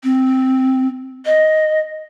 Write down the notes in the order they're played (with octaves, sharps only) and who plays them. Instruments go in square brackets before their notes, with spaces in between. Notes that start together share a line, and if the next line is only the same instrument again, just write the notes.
[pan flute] C4
D#5